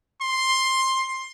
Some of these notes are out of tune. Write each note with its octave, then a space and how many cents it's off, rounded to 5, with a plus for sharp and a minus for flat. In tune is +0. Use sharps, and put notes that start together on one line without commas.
C6 +10